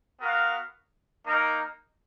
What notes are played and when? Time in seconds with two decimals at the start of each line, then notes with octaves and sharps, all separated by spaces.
0.20 B3 F#4 A#4 F5
1.25 A#3 D#4 A#4